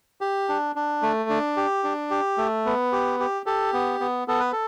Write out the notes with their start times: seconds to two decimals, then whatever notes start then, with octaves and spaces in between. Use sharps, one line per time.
0.21 G4
0.49 D4
0.76 D4
1.02 A3
1.30 D4
1.57 G4
1.84 D4
2.11 G4
2.38 A3
2.66 B3
2.92 G4
3.20 G4
3.46 G4 A4
3.73 B3
4.00 B3
4.28 B3 A4
4.40 B4
4.52 A4